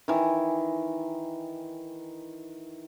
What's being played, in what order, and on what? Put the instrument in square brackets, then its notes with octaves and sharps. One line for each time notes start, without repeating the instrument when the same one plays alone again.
[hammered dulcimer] D#3 E3